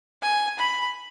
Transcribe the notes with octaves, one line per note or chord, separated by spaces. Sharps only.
G#5
B5